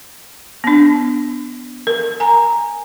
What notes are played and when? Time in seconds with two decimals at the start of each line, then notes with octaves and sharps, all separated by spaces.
0.64 B3 D4
1.87 A#4
2.20 G#5 A#5